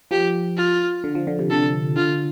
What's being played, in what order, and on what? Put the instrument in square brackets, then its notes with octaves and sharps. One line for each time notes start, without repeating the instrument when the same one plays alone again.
[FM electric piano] F3 [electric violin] G4
[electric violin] F4
[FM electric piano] D3
F3
D3
C3
[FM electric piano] D3 [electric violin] A4
[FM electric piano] D3 [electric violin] F4